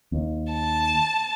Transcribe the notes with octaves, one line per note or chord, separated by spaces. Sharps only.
D#2
A5